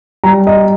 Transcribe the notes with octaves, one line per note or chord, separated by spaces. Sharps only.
G3 A#5
D#5